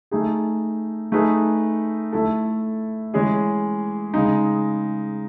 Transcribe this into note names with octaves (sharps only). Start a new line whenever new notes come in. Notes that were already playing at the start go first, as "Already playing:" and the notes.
A3 D#4 G#4
A3 D#4 G#4 B4
A3 E4 A4
E3 G#3 C#4 G#4
C#3 G#3 D#4